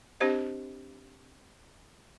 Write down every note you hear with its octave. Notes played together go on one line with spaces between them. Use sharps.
C4 D4 G4 C5 D#5